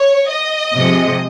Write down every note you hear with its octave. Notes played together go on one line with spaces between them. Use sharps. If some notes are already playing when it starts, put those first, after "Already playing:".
Already playing: C#5
D#5
C3 F3 G#3